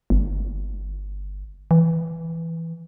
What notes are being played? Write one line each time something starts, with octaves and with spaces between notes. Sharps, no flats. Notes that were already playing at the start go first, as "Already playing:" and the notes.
G1
E3